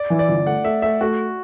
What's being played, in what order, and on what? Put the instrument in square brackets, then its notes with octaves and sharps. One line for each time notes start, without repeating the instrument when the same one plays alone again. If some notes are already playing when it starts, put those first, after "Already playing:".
Already playing: [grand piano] D5
[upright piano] E3
[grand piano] D5
[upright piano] G1
[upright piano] A3 [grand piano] F#5
[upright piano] A3 [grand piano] E5
[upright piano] A3 [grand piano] E5
[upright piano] A3 [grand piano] F#4